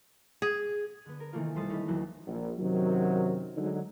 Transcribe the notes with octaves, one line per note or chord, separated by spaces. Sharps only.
G#4
D3 B3
A#4
C3 D#3 E3 A3 A#3 F4
B1 G3 A3 C5 D#6 A6
C4 C#4 D#4 B5
C#2 D#3 E3 F#3
A#1
F#2 C3 D#3 F#3
D2 D3 F#3 G#3 D#4